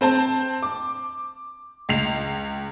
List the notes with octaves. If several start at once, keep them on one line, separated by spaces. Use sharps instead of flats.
C4 C5 A5
D6
C#2 C7 F7